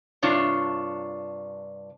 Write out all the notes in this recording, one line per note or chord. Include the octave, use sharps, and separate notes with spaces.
G2 C3 D4 F4 C#5